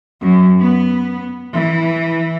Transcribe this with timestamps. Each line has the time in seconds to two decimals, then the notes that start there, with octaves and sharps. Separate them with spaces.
0.21 F#2
0.61 B3
1.54 E3